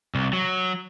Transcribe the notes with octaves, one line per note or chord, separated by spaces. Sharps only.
C2
F#3